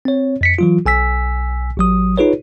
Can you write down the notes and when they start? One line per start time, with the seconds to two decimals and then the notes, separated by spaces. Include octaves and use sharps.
0.05 C4 C#5
0.41 F2 B6 C#7
0.59 E3 F#3 F4
0.86 B1 G#5 E6 B6
1.77 A1 F#3 D#6
2.18 D#4 F4 G#4 B4 C#5